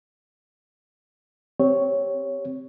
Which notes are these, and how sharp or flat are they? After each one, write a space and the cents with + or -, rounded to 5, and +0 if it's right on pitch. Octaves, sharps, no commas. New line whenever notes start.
C4 +0 G4 +0 C#5 +0